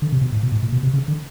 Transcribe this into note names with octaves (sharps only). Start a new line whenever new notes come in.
D3
C3
B2
A2
B2
A2
A#2
B2
C3
C#3
D3